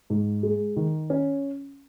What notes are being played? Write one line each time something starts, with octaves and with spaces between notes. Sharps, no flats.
G#2
G#3
D#3
C#4